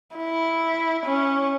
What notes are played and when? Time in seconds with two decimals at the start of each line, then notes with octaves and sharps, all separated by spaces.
0.16 E4
1.06 C#4